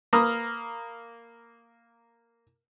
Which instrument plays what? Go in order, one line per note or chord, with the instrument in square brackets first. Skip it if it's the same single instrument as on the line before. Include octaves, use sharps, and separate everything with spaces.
[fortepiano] A#3 A#5 B5 D#6 F6